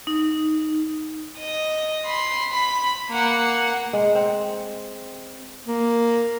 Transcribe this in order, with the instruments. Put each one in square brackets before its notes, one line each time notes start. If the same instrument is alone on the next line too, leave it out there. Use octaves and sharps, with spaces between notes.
[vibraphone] D#4
[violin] D#5
B5 C6
B5
A#3 F#5
[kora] G#3
C4
[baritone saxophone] A#3